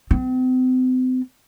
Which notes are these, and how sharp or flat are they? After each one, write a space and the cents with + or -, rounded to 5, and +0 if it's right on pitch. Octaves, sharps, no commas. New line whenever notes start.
C4 -40